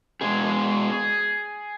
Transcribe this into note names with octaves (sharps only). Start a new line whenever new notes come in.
B2 G#3 G#4